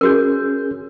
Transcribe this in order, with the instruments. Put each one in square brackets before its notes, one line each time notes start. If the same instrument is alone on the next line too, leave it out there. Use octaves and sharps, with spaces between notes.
[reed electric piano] C#4 G#4 G6 [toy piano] F#4 A#4